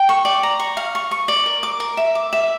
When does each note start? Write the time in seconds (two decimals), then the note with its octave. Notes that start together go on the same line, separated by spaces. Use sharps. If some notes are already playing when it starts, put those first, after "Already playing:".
Already playing: G5
0.09 C#6
0.25 D5
0.43 A#5
0.60 C#6
0.77 F5
0.95 C#6
1.11 C#6
1.28 D5
1.46 A#4
1.63 D6
1.80 A#4
1.97 E5
2.15 D6
2.33 E5